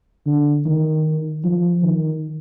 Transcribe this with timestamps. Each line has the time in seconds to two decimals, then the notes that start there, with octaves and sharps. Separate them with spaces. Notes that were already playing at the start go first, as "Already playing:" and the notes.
0.26 D3
0.66 D#3
1.44 F3
1.83 D#3